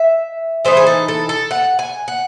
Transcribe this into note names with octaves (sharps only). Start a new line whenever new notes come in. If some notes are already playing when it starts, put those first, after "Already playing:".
Already playing: E5
E3 A3 D#4 C5
G#4
A4
A4
A4
F#5
G#5
F#5